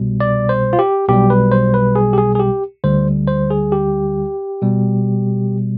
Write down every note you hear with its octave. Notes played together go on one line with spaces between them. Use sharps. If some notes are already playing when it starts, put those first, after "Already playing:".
Already playing: C2 B2 G3
D5
C5
F4
G4
B1 B2 G3 G4
B4
C5
B4
G#4
G4
G#4
G#4
G4
D2 D3 G3 C5
C5
G#4
G4
B2 G3